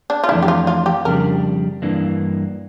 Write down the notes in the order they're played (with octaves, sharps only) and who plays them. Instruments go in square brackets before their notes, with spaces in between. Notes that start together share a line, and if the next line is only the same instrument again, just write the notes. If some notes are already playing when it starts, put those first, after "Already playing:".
[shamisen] D4
F4
[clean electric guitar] F2 E3 A3 D4 [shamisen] E4
[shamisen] G4
F4
F4
G4
[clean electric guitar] F2 C#3 G3 D4 [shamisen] A#4
[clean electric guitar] G2 E3 A#3 D4